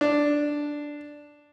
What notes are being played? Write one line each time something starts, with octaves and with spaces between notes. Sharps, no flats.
D4